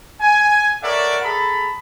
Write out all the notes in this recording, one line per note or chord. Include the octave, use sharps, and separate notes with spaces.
G#5
A4 A#4 C#5 D5 E5 F#5
G#4 A4 A#5 B5